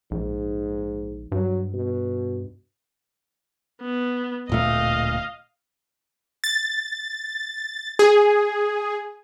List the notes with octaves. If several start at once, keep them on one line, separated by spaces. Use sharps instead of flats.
A#1 G#2
G2 F#3
B2
B3
D1 A#2 A3 D#5 F5
A6
G#4